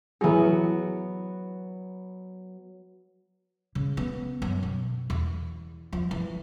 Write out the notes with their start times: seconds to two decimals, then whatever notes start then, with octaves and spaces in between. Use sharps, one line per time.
0.21 E3 F#3 B3 G#4
3.75 C#3
3.97 B3
4.42 F#2
4.63 B2
5.10 E2
5.93 F3
6.11 E3